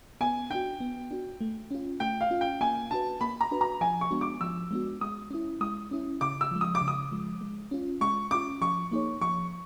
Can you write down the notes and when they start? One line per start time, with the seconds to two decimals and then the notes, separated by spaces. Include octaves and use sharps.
0.21 B3 G#5
0.50 D4 F#4 G5
0.80 B3
1.11 D4 F#4
1.41 A3
1.71 C#4 F4
2.00 A3 G5
2.21 F5
2.31 C#4 F4
2.41 G5
2.61 A#3 G#5
2.91 D4 F#4 B4 A5
3.21 A#3 B5
3.41 A#5
3.51 D4 F#4 B4
3.61 A#5
3.81 F3 G#5
4.01 C#6
4.11 G#3 B3 D4 F#4
4.21 D6
4.41 F3 E6
4.71 G#3 B3 D4 F#4
5.01 G#3 D#6
5.30 C#4 E4
5.61 G#3 D#6
5.91 C#4 E4
6.21 C#3 D6
6.41 E6
6.51 F3 G#3
6.61 D#6
6.75 D6
6.81 C#3
6.88 D#6
7.11 F3 G#3
7.41 G#3
7.71 C#4 F4
8.01 G#3 C#6
8.31 C#4 F4 D6
8.61 F3 C#6
8.91 A#3 D#4 G#4 C#5
9.21 F3 C#6